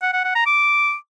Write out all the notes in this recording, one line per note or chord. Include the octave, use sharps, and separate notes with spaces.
F#5
F#5
F#5
A#5
D6